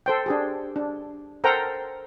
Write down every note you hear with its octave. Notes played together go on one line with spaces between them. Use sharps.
A4 C5 G5
D4 G4 G#4
D4
A4 A#4 C5 F#5 G5 A#5